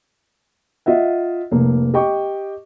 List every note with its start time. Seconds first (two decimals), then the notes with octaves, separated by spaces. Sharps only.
0.86 F4 D#5 E5 F#5
1.51 F1 A#3
1.94 G4 D#5 G5 C#6 D6